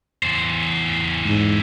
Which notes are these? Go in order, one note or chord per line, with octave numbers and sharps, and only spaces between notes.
E2 C5
G#2